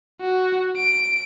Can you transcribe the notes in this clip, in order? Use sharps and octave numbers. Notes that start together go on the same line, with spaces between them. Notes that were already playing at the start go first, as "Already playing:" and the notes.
F#4
D7